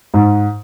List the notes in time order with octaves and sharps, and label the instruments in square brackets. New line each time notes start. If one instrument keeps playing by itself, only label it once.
[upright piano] G#2